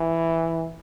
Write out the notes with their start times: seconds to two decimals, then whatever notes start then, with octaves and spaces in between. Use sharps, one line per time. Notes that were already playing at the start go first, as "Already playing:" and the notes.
Already playing: E3